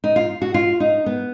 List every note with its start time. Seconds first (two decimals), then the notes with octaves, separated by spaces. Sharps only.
0.04 D#4
0.16 F4
0.42 F#4
0.54 F4
0.80 D#4
1.06 B3